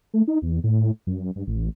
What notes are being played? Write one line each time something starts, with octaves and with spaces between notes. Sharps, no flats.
A3
D#4
E2
A2
F#2
G2
A1